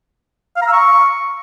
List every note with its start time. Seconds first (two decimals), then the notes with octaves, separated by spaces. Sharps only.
0.56 F5
0.62 A#5
0.67 E6
0.73 C#6